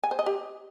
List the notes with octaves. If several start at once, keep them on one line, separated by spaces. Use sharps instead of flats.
G#5
C5
D#5
G4